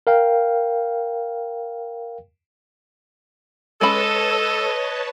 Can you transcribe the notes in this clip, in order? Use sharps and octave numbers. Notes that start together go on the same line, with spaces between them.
A#4 F5 G5
G#3 C#4 A4 B4 C#5 D#5 A5 B5